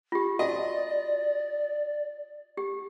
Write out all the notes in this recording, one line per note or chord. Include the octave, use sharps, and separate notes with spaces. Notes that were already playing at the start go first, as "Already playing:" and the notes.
F4 G4
F#4 D5 D#5
G4